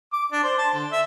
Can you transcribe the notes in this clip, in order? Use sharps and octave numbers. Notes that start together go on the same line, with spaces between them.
D6
D4
C5
A5
D3
E5